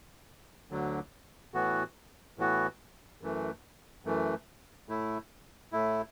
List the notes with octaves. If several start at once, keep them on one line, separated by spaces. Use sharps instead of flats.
D2 D3 F#3
A2 E3 B3 F#4
A2 E3 B3 F#4
F#2 E3 A3
F#2 E3 A3
A2 A3 E4
A2 A3 E4